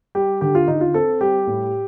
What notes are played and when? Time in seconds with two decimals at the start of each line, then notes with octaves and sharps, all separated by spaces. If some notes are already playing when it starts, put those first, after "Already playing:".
0.15 G3 G4
0.41 D3 G4
0.55 F4
0.68 D3 D#4
0.81 F4
0.94 C4 A4
1.21 G3 G4
1.47 A2